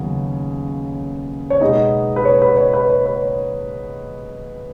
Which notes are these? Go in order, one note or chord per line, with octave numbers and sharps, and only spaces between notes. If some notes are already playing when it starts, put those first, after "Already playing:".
Already playing: D#2 C#3 F#3 B3
C#5
B2 G#3 B3 D#4 D#5
B4
C#5
B4
C#5
B4
C#5
B4
C#5